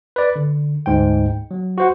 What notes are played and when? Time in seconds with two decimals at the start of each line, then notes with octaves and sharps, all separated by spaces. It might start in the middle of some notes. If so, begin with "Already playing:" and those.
0.16 B4 D5
0.36 D3
0.86 D2 G#2 G5
1.51 F#3
1.78 F#4 C5 F#5